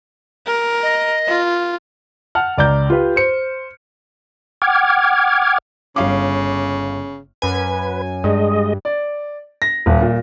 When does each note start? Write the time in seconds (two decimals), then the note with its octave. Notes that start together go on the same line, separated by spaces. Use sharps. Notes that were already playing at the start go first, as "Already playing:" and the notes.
0.47 A#4
0.83 D#5
1.28 F4
2.35 F#5 A5 F6
2.58 C#2 D5 A#5 G6
2.90 F4 G4 B4
3.16 C5 C#7
4.62 F#5 G5 D6 F6 G#6
5.96 G1 C#3 F5 D6
7.42 F#2 B4 G#5
8.24 G2 G#3 D#5
8.85 D5
9.62 A#6
9.86 D#1
10.01 A#2